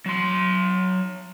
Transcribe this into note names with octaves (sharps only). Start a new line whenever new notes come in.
F#3 C6